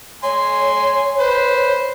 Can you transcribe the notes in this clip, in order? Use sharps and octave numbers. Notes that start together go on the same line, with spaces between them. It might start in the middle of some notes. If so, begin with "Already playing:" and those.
C#5 G#5 C6
B4 C5